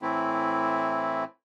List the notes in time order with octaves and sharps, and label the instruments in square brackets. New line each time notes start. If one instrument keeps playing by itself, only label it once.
[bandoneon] A2 E3 A3 C4 E4